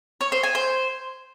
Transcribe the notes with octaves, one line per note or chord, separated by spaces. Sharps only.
C#5
C5
G#5
C5